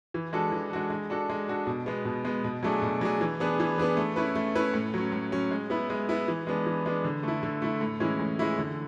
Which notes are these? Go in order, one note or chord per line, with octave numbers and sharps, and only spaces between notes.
E3
G#3 D4 F#4 A4
E3
G#3 D4 F#4 A4
G#3
D4 F#4 A4
G#3
D4 F#4 A4
B2
G#3 B3
B2
G#3 B3
B2
F#3 A3 D4 G#4
B2
F#3 A3 D4 G#4
E3
B3 D4 G#4 B4
E3
B3 D4 G#4 B4
A3
C#4 E4 B4
A3
C#4 E4 B4
A2
F#3 C#4
A2
F#3 C#4
G#3
B3 E4
G#3
B3 E4
E3
G#3 B3 D4
E3
G#3 B3 D4
D3
A3 E4
D3
A3 E4
A2
E3 G#3 C#4 E4
A2
E3 G#3 C#4 E4
D3